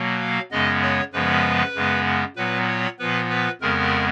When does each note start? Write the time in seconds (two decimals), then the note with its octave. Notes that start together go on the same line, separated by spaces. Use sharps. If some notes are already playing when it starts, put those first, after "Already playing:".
Already playing: B2 F#3 A#3
0.20 F5
0.51 F#2 C#3 G#3 B3 D#5
0.82 C#5
1.13 F#2 C#3 F3 G#3 B3 B4
1.75 F#2 C#3 G#3 B3
2.36 A#2 F#3 B3 B4
2.68 C#5
2.99 A#2 F3 B3 B4
3.30 B4
3.61 F2 C#3 G#3 B3 A#4